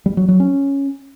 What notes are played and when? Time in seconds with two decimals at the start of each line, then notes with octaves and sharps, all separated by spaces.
0.06 G3
0.17 F#3
0.28 F#3
0.40 C#4